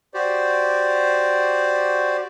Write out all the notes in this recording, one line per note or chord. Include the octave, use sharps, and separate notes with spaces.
F#4 G4 C5 D5